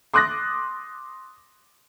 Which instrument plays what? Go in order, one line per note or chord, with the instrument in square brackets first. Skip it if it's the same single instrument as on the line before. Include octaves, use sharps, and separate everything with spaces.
[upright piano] C6 D6 D#6 F#6 A6 A#6